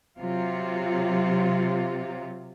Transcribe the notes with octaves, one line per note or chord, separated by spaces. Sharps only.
C3 F#3 F4